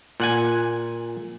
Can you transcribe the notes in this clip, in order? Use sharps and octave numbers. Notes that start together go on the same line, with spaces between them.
A#2 F#5 G#5